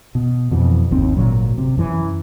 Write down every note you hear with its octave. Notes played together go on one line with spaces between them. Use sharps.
B2
F2 B2 E3
G1 D#2 C4 C#4
G#1 D2 A#2 F#3
C3
F#2 E3